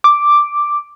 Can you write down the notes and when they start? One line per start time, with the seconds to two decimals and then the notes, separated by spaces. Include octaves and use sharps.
0.04 D6